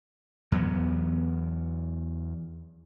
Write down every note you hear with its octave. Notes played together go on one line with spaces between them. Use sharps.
E2 F#3 A3 B3